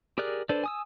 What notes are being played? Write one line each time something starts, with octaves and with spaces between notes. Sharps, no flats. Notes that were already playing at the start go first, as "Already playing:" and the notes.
G4 G#4 A#4 D5 F#6
D4 A4 B4 C5 D5
G#5 D#6 E6